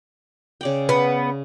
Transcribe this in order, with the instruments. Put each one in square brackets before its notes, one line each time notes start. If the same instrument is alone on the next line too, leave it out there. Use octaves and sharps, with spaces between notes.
[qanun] C#3 D5 G5
[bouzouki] B3